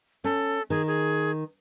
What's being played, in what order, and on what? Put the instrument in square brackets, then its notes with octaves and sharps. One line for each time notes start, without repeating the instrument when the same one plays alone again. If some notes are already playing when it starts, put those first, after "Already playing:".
[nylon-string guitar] C#4 [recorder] A4
[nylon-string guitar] D#3 [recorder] G#4
[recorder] G#4